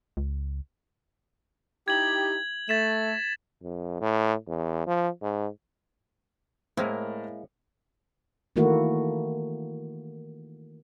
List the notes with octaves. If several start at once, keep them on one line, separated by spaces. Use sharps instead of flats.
C#2
D#4 E4 G4 G#6 F#7
A3 A6 B6 E7
F2
A2
E2
F3
G#2
A2 G#3 A#3 C4 E4 A#4
D#3 E3 A3 A#3 E4 F#4